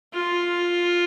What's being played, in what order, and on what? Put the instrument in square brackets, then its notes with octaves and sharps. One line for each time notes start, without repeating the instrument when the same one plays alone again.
[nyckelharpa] F4